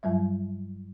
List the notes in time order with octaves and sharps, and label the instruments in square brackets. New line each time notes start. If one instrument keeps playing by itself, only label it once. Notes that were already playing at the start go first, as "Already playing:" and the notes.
[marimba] G2 F#3 G3 E5